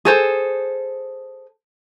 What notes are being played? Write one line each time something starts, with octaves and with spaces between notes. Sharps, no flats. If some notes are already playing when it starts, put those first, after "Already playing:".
G#4 A4 C5